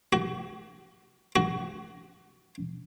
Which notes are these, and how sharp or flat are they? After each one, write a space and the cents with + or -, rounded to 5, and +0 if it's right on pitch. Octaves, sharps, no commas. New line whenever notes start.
F#4 +35
F#4 +25